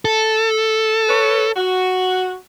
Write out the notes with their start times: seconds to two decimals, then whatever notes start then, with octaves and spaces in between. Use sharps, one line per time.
0.05 A4
1.09 B4 C#5
1.56 F#4